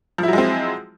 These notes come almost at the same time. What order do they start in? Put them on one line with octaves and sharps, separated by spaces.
F3 E4 F#3 G#3 C4